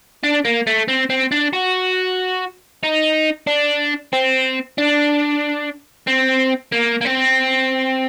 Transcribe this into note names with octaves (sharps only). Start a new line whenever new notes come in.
D4
A#3
A3
C4
C4
D4
F#4
D#4
D4
C4
D4
C4
A#3
A#3
C4